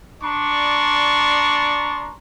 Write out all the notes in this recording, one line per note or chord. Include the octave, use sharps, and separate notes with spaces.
D4 D5 A#5 C6 C#6